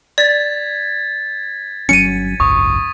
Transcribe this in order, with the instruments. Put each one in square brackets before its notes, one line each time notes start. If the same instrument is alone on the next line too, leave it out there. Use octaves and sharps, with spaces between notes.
[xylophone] D5 [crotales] G#6 A6 B6
[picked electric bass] G1 F#3 C#4 [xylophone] C#7 D#7
[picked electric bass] G#1 C#2 F#2 [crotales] C#6 D#6